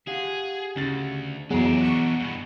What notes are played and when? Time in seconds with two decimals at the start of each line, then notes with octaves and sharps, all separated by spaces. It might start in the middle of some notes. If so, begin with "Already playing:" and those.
0.07 G4 G#4 F5 F#5
0.76 D2 C#3 A6
1.50 F2 E3 F#3 G#3 B3 D4 G#4 A#5
1.81 F#5 C#6
2.20 G2 B2